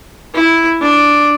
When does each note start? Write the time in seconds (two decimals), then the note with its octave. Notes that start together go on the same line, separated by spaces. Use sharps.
0.34 E4
0.81 D4